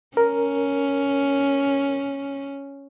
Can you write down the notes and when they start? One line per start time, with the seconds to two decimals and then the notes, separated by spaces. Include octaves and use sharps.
0.17 C#4 A#4